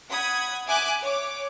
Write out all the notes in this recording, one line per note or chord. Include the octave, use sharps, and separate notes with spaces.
F#5 B5 D#6 G#6
E5 G#5 D6 F#6
C#5 D6